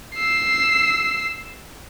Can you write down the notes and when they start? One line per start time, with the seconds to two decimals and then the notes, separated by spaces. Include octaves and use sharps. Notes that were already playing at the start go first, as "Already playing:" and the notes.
0.16 E6 C7